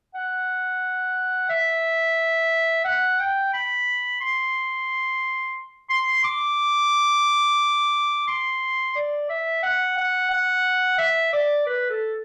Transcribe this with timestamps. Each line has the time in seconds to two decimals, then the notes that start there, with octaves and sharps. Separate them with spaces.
0.14 F#5
1.49 E5
2.85 F#5
3.20 G5
3.53 B5
4.20 C6
5.90 C6
6.24 D6
8.27 C6
8.95 D5
9.29 E5
9.63 F#5
9.97 F#5
10.31 F#5
10.98 E5
11.33 D5
11.66 B4
11.89 A4